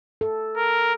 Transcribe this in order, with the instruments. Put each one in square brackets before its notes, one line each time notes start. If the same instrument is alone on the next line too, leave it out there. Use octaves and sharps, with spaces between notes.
[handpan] A4
[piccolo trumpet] A#4